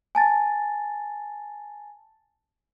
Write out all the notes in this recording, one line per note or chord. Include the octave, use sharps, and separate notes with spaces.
G#5 A5 A6